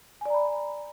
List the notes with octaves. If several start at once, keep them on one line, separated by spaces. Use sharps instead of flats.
D5 G#5 A#5 B5